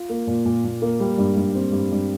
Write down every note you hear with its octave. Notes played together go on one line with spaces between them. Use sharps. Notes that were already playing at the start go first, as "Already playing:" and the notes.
Already playing: F4
A#3
A#2
A#2
A#2
A#3
G3
G2
G2
C4
G2
G2